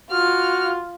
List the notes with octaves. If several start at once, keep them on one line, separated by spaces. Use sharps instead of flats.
F4 F#4 F6